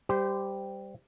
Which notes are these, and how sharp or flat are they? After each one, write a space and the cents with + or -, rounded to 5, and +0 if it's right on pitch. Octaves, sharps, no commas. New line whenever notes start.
G3 +0 G4 +0 C5 -25